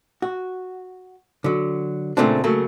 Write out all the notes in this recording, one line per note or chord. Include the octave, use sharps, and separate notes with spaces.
F#4
D3 F#3
A#2 C#3 A3 A#3 C4 D4
C#3 F#3 A3 A#3